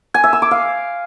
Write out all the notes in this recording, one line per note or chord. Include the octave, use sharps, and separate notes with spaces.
G#5
E5
E6
D6
F5